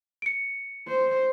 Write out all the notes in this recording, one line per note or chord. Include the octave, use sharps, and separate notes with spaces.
C#7 D7
C5